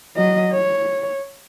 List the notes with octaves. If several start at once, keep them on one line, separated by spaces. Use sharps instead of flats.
F#3 D#5
C#5